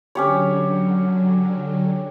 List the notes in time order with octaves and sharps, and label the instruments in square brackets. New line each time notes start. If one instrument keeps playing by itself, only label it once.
[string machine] D3 F#3 [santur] C#4 G4 C#5